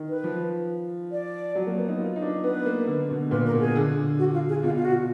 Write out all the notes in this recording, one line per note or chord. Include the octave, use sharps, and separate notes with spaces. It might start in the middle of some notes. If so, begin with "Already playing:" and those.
Already playing: D#3
B4
F3
D5
F#3
A#3
B3
D#4
F4
D#4
D4
B3 B4
A#3
D3
B2
A#2 B4
A#4
B2
G#4
D3
F#4
F4
G#4
B2 F4
F4
F#4